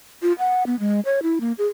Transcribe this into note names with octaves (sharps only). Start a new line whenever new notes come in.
F4
F#5
B3
G#3
C#5
E4
A#3
G#4